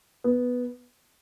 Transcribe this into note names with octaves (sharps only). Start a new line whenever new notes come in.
B3